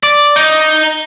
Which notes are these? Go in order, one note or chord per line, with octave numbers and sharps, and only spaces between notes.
D5
D#4